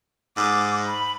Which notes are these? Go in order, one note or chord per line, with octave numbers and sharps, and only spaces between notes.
G#2 D6
B5